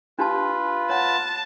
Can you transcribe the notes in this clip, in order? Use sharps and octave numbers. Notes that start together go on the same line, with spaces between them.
D4 F4 G4 B4 A5
C#5 F#5 A5